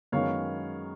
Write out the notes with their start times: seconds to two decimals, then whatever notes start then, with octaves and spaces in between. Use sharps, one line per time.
0.12 F#2 D#3 G#3 B3 C#5 F5